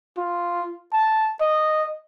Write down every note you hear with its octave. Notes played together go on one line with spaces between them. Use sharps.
F4
A5
D#5